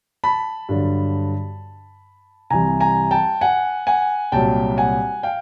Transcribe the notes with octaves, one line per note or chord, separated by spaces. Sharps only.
A5 B5
G2 D3 F#3
C2 C3 E3 G3 G#5 A#5
G#5 A#5
G5 A5
F#5 G#5
F#5 G#5
C2 A#2 F#3 G5 A5
F#5 G#5
F5 G5